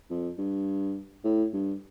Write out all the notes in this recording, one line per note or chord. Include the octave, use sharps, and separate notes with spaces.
F2
G2
A2
G2